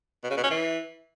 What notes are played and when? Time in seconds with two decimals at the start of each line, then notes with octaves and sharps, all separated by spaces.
0.24 B2
0.30 C#3
0.37 B2
0.44 C#4
0.50 E3